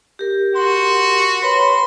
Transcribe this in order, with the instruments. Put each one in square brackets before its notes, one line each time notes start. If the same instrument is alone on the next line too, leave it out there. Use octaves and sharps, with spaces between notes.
[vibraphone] G4 A#4
[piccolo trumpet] F#4 [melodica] C6
[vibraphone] B4 C#5 B5 [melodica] C6